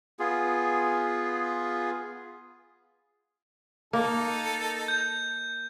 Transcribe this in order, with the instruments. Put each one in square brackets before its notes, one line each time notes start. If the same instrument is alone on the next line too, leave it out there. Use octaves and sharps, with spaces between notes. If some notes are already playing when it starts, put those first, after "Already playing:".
[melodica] B3 F4 G#4
[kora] A#3 [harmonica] D#4 A4
[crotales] G6